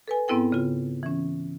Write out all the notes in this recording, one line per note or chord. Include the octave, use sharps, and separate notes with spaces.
A4 B4 G#5
G#2 B3 C4 E4 A4 G5
C#3 F4
E3 C#4